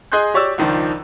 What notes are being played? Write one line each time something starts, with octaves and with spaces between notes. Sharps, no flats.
G#4 D#5 G#5 C6 F#6 G6
G4 C#5 D5 E6
C#2 D#3 F3 D4